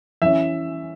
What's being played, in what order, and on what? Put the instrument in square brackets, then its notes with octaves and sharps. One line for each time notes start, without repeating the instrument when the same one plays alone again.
[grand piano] E3 C#4 E5